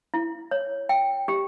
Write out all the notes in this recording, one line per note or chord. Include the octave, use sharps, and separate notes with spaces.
E4
C#5
G5
G4